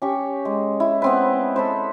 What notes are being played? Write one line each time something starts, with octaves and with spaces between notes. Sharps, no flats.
C#4 G4 C#6
G#3
E4
B3 C4 B4
A4 B4 C5